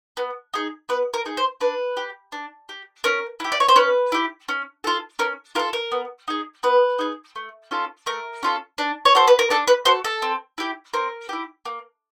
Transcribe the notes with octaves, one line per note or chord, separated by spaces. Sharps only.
B3
D#4 G#4
B3 B4
A#4
D#4 G#4
C5
D4 B4
G4
D4
G4
C#4 A#4
E4 G4
D5
C#5
C5
C#4 B4
E4 G4
C#4
F4 A4
C#4 A#4
F4 A4 A#4
A#4
B3
D#4 G#4
B3 B4
D#4 G#4
A3
C#4 F4 A4
A3 A#4
C#4 F4 A4
D4
C#5
F#4 A4 C5
B4
A#4
D4 A4
B4
F#4 A4 C5
A4
C4
E4 G4
C4 A#4
E4 G4
A#3